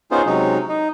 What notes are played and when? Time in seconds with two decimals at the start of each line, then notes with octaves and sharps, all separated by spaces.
0.11 B3 C#4 D#4 F4 G#4 C5
0.26 C3 F#3 G#3 C#4 D#4
0.69 D#4